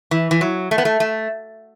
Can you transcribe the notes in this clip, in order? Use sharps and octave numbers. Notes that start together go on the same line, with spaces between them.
E3
E3
F#3
A3
B3
A3
A3